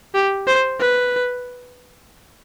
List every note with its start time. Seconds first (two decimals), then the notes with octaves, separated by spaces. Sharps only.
0.14 G4
0.47 C5
0.80 B4